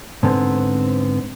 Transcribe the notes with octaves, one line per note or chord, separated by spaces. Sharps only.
G#2 D3 B3 C4